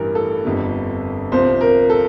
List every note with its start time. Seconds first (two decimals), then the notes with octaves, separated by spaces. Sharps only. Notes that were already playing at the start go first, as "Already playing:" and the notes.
Already playing: A1 G2 E3 G3 A#4
0.15 A4
0.45 G1 F2 D3 G3
1.32 C2 C3 F3 C5
1.61 A#4
1.90 A4